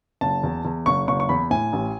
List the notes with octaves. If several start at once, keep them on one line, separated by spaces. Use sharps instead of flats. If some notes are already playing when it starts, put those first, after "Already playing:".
F#1 A5
E2
E2
F#1 C#6
F#1 C#6
C#6
E2 B5
A2 G#5
A1